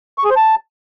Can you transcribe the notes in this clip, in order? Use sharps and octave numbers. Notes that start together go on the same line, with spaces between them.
C#6
G#4
C5
A5